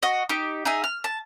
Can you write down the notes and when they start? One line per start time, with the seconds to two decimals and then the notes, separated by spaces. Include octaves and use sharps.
0.03 F#4 D#5
0.29 D#4 G4
0.65 D#4 G#4 E5
0.84 F6
1.04 A5